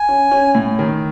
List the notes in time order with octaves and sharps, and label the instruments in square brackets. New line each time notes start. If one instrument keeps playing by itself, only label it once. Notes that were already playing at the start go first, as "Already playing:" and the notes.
Already playing: [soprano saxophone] G#5
[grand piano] C#4
C#4
A2
D#3